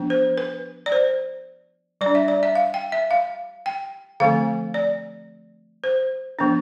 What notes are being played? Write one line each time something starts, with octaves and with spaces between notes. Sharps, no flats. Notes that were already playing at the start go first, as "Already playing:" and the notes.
Already playing: F3 B3 D4
C5
B4
D5
C5
G3 D5
D4
E5
D5
E5
F5
G5
E5
F5
G5
D3 F3 A3 C4 F5
D5
C5
F3 B3 D4